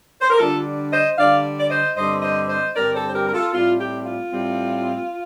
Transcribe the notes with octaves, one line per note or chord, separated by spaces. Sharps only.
C5
A#4
D3 G3 D4 F4 A4
C5 D#5
D3 G3 D4 D5 F5
D5
C5 D#5
G2 D3 G3 C4 C5 D#5
C5 D#5
C5 D#5
G2 D3 G3 C4 A#4 D5
A4 C5
C5
G4 A#4
A#4
F4 A4
A2 G3 C4 F4
G4
F4
A2 G3 C4